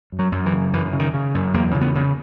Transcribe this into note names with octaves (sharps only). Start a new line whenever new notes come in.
F#2
F#3
F#2
E3
C#3
F#2 E3
C#3
D#3
C#3
F#2
E2 A#3
C#3
B3
C#3